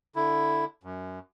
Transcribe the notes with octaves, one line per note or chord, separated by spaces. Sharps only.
D3 E4
F#2